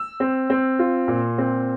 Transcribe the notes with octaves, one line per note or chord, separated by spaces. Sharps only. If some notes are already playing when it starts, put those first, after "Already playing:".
Already playing: E6
C4
C4
F4
A#2
C4